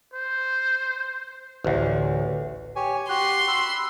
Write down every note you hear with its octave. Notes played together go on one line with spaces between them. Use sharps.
C5
A1 D2
G4 C#5 G#5
F#4 G4 C6 F#6
B5 E6